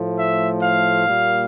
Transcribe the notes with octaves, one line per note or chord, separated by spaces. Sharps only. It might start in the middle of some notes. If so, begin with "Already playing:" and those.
Already playing: A2 F3 A3
E5
F5
A#2 G3 A#3